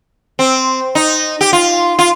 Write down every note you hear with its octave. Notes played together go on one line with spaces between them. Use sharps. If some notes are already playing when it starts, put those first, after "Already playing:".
C4
D#4
G4
F4
F4